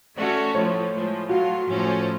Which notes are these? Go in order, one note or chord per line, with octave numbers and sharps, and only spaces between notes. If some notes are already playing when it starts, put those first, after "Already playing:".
A3 C#4 F#4 A4 D5
A2 F3 A3 C#5
A2 F3 G#3
F#3 A3 F4 F#4
A2 F3 A3 C#4